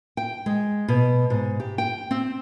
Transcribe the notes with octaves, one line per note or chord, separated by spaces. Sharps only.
G5
G#3
B2
G#2
G4
G5
C4